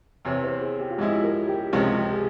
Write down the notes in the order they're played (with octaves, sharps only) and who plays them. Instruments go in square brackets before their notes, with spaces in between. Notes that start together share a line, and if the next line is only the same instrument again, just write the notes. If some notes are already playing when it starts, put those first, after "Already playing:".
[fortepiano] E2 C3 E3 [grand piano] C#5
[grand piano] C5
G#4
G4
F4
[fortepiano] G#2 F3 G#3 E4 [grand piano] G4
[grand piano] A#4
G4
[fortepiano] C#2 C3 F3 G#3 C#4 [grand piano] F4
[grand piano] G4
G#4